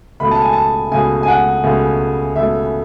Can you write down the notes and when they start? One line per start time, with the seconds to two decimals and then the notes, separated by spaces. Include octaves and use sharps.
0.20 C#2 B2 A3 B5
0.31 A5
0.42 G#5
0.53 A5
0.92 C#2 B2 A3 G#5
1.23 G#5
1.28 F#5
1.64 C#2 B2 A3
2.36 C#2 B2 A3 E5